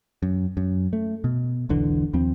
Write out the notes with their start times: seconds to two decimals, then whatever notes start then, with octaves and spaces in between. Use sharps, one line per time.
0.23 F#2
0.57 F#2
0.93 A3
1.24 B2
1.69 E1 B1 D3 E3
2.13 D#2 F3 C4